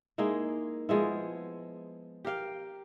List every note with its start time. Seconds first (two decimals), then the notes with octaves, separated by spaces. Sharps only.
0.18 G#3 A#3 D#4 E4
0.89 F3 G#3 B3 E4
2.25 G4 A#4 F5 G5